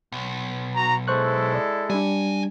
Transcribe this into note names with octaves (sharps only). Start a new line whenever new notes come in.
B1
F#4 A#5
G#3 E4 A4 C5 C#6 F#6
D5
F#3 G3 D4 G#5